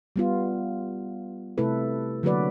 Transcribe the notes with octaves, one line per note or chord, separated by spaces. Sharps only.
G3 B3 F4
C3 A3 E4 A4 B4
D3 F#3 A#3 F#4 B4 D5